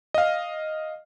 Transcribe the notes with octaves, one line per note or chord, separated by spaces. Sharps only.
D#5 F5